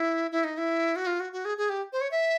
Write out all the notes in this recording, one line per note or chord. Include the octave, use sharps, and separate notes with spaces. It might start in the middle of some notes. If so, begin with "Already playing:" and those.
Already playing: E4
E4
D#4
E4
F#4
F4
F#4
F#4
G#4
G#4
G4
C5
C#5
E5